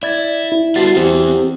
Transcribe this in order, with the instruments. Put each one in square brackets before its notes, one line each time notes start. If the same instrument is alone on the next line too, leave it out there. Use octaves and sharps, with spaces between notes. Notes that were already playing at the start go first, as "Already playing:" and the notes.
[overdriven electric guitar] E4 [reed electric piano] D5 G#6 A6
[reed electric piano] E4
[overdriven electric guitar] G3 B3 [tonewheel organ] F#4 A5 C6
[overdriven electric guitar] E2 [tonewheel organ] C4 G4